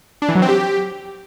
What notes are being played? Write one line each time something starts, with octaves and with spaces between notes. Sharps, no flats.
D4
E3
F#3
C4
G4